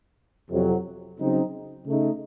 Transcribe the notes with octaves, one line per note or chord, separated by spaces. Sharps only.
F2 C3 F#3
C#3 F#3 C4 D#4
C#3 A3 D#4